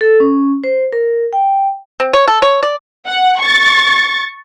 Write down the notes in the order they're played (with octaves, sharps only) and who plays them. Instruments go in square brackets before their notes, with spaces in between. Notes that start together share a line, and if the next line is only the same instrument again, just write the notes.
[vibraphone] A4
C#4
C5
A#4
G5
[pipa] C4
C#5
A4
C#5
D5
[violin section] F#5
C#6 A6